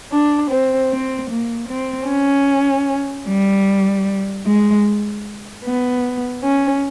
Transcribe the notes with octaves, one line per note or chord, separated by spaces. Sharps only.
D4
C4
C4
A#3
C4
C#4
G3
G#3
B3
C#4